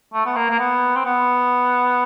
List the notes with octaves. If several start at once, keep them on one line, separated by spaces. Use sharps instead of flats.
A3
B3
A#3
A#3
B3
C4
B3